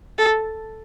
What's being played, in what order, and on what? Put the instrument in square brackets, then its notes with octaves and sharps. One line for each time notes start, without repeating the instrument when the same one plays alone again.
[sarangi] A4